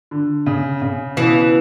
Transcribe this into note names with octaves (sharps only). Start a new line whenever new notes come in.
D3
C#3
C#3
B2 E3